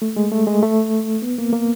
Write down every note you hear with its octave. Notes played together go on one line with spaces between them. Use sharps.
A3
G#3
A3
G#3
A3
B3
A#3
A#3